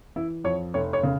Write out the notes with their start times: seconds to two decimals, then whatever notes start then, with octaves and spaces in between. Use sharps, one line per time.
0.16 E3 E4
0.44 F2 C#5
0.74 F1 C#5
0.93 C#5
1.03 C#3